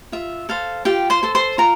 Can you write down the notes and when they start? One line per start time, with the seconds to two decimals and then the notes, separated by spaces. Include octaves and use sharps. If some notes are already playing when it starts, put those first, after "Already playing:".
0.12 F4 E5
0.49 A4 C5 F5
0.85 F4 G4 G5
1.10 C5 C6
1.23 A4 C5
1.35 C5 C6
1.58 F4 A#4 A#5